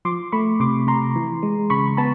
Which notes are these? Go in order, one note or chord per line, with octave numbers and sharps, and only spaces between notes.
F3 C6 D6
A3 B5 C#6
C3 C6 D6
C3 A#5 C6
E3
G#3
C#3 B5 C#6
B3 A5 B5